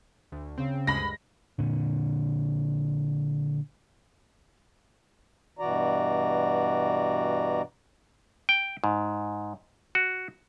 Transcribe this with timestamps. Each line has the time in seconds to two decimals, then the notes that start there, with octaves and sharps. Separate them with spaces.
0.32 D2
0.58 C#3 C4
0.87 D2 G2 G#3 B5 A#6
1.59 A#2 D3
5.59 G2 B2 E3 F#4 D5 A#5
8.49 G5
8.84 G#2
9.95 F#4